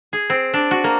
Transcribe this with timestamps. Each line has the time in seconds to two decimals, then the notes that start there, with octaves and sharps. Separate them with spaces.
0.13 G#4
0.30 C4
0.54 D4
0.71 F#4
0.84 A#3